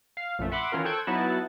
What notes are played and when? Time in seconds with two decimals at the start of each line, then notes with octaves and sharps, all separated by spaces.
0.17 F5
0.39 A#1 F#2 A3
0.52 E5 F#5 B5 C6 D6
0.72 D#3 E3 C#4 F4 A#4
0.85 A4 C5 G5 C#6 F#6 G#6
1.07 F#3 B3 D#4 E4 F#4 A5